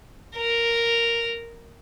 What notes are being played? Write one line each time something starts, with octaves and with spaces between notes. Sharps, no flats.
A#4